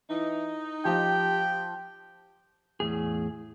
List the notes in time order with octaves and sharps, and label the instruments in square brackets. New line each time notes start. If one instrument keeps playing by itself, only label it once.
[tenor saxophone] E3 [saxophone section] D#4
[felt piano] F3 [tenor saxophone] G4 [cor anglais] G5
[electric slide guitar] E2 A2 G#4